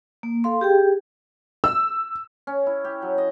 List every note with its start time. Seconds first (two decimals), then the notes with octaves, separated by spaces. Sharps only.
0.23 A#3
0.44 A4 F5 C6
0.61 G4 G#4 G5
1.64 E6
2.47 C#4
2.67 E4
2.84 G4
3.02 F#3
3.18 D#5